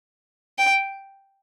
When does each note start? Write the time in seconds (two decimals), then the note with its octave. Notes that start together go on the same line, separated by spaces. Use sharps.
0.58 G5